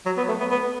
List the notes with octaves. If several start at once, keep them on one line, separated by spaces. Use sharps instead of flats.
F#3
B3
A3
B3
B3